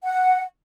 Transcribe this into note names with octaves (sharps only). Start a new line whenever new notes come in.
F#5